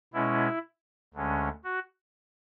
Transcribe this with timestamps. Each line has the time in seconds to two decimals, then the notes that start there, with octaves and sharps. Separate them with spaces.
0.13 B2 G#3 C#4 E4
1.14 D2 D3 G#3 C#4
1.64 F#4